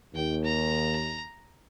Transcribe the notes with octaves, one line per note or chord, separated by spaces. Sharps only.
D#2 G5
A#5